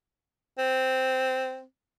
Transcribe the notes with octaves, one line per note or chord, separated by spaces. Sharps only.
C4